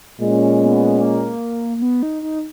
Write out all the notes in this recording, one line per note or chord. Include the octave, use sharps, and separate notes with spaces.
A#2 G#3 C#4
B3
A#3
A#3
B3
D#4
D#4